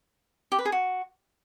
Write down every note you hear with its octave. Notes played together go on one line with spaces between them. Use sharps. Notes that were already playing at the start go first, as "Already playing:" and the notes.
G4
B4
G#4
F#4